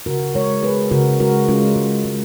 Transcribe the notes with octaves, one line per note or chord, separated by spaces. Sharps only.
C#3 F#4 A#4
G#3 A#4 C#5
G#3 G#4 B4
C#3 F#4 A#4
G#3 F#4 A#4
G#3 C#4 F4
G#3
G#3